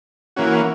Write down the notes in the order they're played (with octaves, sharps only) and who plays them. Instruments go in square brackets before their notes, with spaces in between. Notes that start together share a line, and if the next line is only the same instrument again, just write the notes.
[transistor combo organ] E3 A#3 C#4 F#4